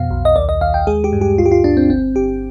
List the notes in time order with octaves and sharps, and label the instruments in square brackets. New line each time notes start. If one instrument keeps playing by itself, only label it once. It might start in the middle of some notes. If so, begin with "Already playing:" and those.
Already playing: [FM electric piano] F2 B2 F5
B1
D#5
D#2 D5
D#5
D#2 F5
G5
G#3 G#4
G4
G2
G4
D2 F4
G4
F4
D2 D4
C4
G1 C4
G1 G4